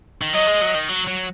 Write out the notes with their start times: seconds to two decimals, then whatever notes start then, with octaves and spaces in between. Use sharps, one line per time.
0.22 D#3
0.33 F#3 D#5
0.47 G#3
0.62 F#3
0.75 D#3
0.89 F#3
1.07 F#3